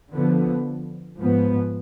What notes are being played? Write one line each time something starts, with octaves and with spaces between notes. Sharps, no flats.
D3 F3 B3
G#2 F3 B3